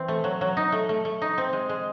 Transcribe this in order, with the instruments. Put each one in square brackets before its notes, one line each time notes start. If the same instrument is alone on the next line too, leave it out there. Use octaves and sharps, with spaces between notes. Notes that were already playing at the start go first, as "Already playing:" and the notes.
Already playing: [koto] E3 C4
A3
F#3
F#3
D#4
A3
A3
A3
D#4
C4
G#3
G#3